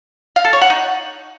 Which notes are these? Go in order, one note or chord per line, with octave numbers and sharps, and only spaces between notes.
F5
A4
C#5
F#5
D#4